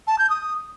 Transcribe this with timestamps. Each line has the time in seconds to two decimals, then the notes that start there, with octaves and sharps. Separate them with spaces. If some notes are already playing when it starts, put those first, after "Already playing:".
0.07 A5
0.18 G6
0.30 D#6